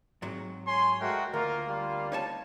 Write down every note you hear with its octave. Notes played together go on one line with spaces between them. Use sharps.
G#2 C3 F#3
C#5 G#5 C6
G#3 A3 F#4 A#4 G5
D2 A#3 F4 A#4
G3 F4
D#4 C#5 A5